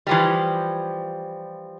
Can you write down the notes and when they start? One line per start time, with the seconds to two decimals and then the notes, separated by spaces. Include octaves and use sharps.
0.07 E3 F3 G3